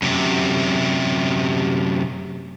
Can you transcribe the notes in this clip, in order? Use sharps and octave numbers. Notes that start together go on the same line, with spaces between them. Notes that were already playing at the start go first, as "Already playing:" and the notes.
F#2 C3